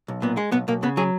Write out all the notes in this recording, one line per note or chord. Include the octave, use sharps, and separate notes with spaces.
B1
A#2 B3
G#3
B1 B3
B1 A#3
C#3 B3
F#3 G#4